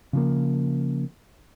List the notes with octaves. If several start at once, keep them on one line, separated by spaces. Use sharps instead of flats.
C#3 F3 A#3